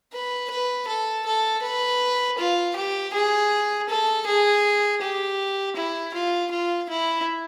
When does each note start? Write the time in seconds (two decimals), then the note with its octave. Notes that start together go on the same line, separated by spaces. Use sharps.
0.12 B4
0.50 B4
0.87 A4
1.26 A4
1.62 B4
2.38 F4
2.76 G4
3.13 G#4
3.89 A4
4.26 G#4
5.01 G4
5.76 E4
6.14 F4
6.51 F4
6.89 E4